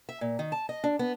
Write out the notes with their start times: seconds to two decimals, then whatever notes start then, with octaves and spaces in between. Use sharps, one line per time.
0.09 E5
0.21 A#2
0.39 D#3
0.52 A5
0.69 D#5
0.84 D4
0.99 B3